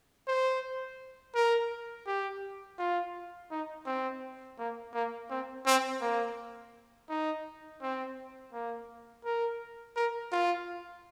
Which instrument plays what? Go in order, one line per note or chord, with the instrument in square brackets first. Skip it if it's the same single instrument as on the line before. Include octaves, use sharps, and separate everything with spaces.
[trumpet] C5
A#4
G4
F4
D#4
C4
A#3
A#3
C4
C4
A#3
D#4
C4
A#3
A#4
A#4
F4